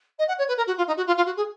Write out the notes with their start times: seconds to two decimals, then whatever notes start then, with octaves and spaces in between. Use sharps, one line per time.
0.18 D#5
0.27 F#5
0.38 C#5
0.48 B4
0.57 A#4
0.67 F#4
0.77 F4
0.87 D#4
0.96 F#4
1.06 F4
1.16 F4
1.25 F#4
1.36 G#4